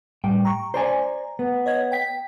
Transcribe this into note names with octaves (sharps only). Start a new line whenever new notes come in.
A2 G3 G5
A#5 C#6
C5 D5 G#5 A#5
B3
C#5 D#5 G#6
G5 B6